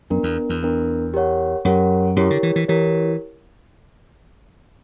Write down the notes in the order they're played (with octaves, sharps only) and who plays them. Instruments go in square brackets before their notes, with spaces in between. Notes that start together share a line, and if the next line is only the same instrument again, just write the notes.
[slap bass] F#2 [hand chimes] B3 D4 A#4
[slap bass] E2
E2
[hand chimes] B3 D4 A#4
G4 A#4 C#5 F#5
[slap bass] F#2 [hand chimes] G4 A#4 C#5 F#5
[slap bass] F#2 [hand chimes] E4 G4 A#4 C#5
[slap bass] D3
E3
E3
[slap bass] E3 [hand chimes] E4 G4 A#4 C#5